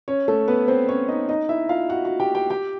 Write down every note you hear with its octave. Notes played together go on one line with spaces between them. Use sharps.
C#4 C#5
A3 A4
B3 B4
C4 C5
C#4 C#5
D#4 D#5
D#4 D#5
E4 E5
F4 F5
F#4 F#5
F#4 F#5
G4 G5
G4 G5
G4 G5